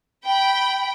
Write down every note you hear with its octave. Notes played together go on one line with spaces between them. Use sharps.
G5 B5